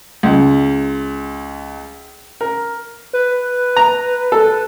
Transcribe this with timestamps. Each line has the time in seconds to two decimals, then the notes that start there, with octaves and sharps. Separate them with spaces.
0.23 C#2
2.41 A#4
3.13 B4
3.77 A#5
4.32 A4